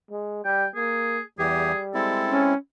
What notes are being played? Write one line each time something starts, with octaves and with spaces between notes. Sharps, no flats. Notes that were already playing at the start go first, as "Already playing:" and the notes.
G#3
G3 G5
A#3 G#4
E2 E3 G3 G4 G#4
G#3 C4 E4 A4
C#4